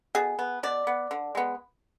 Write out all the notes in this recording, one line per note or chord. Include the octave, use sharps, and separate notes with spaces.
B2 G#4
B3
B2 D5
B3
D3
G#3 B3